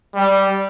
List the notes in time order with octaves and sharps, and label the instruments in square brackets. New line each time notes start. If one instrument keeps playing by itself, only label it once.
[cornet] G3